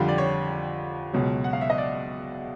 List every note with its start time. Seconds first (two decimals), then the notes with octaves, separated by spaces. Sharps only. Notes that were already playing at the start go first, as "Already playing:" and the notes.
Already playing: F2 D3 G3 F5 G5
0.08 D5
0.18 C#5
1.13 C#2 B2 F#3
1.44 F#5
1.53 F5
1.61 E5
1.70 D#5
1.78 D5